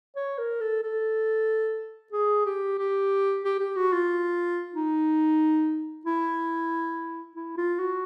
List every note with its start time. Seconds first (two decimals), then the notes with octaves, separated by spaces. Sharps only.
0.16 C#5
0.38 A#4
0.61 A4
0.83 A4
2.12 G#4
2.46 G4
2.78 G4
3.44 G4
3.59 G4
3.76 F#4
3.93 F4
4.74 D#4
6.05 E4
7.36 E4
7.57 F4
7.79 F#4